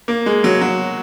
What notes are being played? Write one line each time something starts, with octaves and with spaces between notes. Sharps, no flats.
A#3
G#3
F#3
F#3